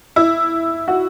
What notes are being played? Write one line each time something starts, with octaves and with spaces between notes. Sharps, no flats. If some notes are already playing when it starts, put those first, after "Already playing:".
E4
F#4